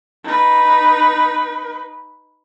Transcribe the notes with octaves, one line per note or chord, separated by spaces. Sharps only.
D#4 B4